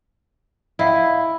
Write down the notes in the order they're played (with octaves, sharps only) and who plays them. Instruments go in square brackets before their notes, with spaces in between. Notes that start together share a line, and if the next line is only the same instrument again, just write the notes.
[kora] E4 [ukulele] D#5 F5 G5